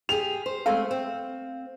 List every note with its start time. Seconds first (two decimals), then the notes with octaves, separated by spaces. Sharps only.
0.09 G4 G#4 F7
0.46 C5
0.66 G#3 A3 C4 F5
0.91 C4